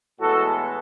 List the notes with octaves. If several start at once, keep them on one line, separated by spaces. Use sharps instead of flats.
A2 E3 G#3 B3 F#4 A4